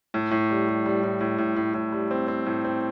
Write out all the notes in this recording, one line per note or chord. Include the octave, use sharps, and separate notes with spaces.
A2
A2
G3
G3
G3
A2
A2
A2
A2
A2
G3
C4
C4
A2
C4